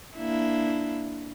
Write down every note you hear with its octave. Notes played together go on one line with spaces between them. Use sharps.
A#3 D4 E4